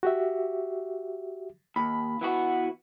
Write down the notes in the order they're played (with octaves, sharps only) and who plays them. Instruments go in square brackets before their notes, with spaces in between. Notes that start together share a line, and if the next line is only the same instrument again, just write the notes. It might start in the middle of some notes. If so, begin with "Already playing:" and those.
[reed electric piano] F#4 G4 E5
[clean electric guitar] D#2 [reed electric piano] B5
[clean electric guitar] E3 B3 F#4